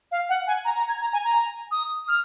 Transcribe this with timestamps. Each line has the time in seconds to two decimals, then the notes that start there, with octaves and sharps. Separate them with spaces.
0.12 F5
0.29 F#5
0.47 G#5
0.65 A#5
0.77 A#5
0.89 G#6
1.01 A#5
1.13 G#5
1.24 A#5
1.71 D#6
2.08 F6